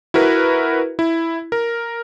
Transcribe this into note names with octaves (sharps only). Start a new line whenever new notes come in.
E4 F#4 A#4 B4
E4
A#4